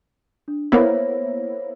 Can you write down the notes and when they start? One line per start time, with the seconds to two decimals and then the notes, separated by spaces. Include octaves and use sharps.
0.48 D4
0.72 A#3 B3 E4 C5 C#5 A#6